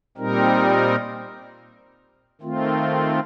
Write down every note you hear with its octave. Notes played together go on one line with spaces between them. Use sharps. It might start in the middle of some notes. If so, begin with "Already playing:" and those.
A#2 G3 C4 D#4 A#4
D#3 A3 C4 F4